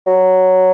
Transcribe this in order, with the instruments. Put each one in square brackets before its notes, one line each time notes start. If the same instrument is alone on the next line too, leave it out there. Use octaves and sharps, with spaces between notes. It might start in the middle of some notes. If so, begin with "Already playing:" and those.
[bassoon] F#3